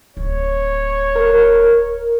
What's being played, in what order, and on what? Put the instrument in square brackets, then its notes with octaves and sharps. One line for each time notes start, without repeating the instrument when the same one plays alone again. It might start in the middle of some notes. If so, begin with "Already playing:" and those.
[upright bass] D1 [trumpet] C#5
[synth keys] A#4